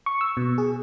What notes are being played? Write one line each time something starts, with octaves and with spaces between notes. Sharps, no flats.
C#6
E6
B2
G#4